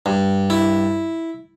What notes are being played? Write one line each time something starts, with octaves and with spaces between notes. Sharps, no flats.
G2
E4